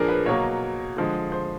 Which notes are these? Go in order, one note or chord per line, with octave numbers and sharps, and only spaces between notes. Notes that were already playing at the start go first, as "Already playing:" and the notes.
Already playing: A#2 F3 A#3 D4 G#4 A#4
B4
B2 F#3 A#3 C#5
D3 F3 G#3
C5